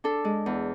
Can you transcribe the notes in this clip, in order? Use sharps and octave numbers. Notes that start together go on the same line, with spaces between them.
D4 A4
G#3
E2